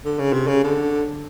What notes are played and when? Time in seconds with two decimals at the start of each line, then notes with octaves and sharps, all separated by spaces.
0.05 D3
0.19 C#3
0.33 C3
0.48 C#3
0.64 D3